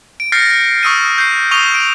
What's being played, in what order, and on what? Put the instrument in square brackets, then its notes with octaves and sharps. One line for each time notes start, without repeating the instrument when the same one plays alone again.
[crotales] D7
F6 G6 A6 A#6 C7 C#7
C#6 D#6 E6 D7 D#7
G6 C7
C#6 D#6 D#7 F7 G7
D7